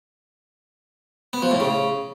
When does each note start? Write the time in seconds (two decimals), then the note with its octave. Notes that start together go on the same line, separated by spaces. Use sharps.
1.33 B3
1.42 F3
1.51 A2
1.60 C#3